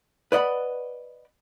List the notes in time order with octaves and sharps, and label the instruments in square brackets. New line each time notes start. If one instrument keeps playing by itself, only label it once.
[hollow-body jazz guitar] B4 D5 D#5 F#5 B5